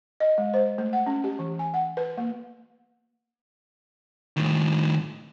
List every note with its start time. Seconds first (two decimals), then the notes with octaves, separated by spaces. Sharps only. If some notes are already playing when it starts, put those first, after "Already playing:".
0.20 D#5
0.38 G#3
0.54 C5
0.78 A3
0.93 F#5
1.07 C#4
1.24 G4
1.39 E3
1.59 G#5
1.74 F#5
1.97 B4
2.18 A#3
4.37 A2 D#3